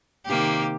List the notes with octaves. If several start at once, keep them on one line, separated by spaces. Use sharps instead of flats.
C3 D#3 A#3 G4